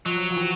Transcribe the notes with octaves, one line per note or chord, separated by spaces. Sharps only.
F3 F#3
F3
E3